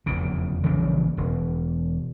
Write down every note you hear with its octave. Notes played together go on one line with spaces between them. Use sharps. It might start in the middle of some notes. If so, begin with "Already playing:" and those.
F1 E2 C#3
A#1 C#3 E3 G3
E1